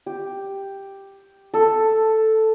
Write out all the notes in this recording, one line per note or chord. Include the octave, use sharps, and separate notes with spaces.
G4
A4